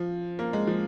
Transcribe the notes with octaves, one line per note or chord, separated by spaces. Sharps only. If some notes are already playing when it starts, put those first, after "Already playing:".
Already playing: F3
A#3
G#3
F3